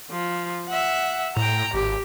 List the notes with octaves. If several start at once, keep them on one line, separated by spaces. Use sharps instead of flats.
F3
E5 F#5
A2 G5 A#5
G#1 G4